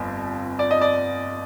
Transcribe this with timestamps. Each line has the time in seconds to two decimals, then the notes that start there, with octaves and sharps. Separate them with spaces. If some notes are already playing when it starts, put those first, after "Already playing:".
Already playing: G1 F2
0.59 D5
0.71 D#5
0.81 D5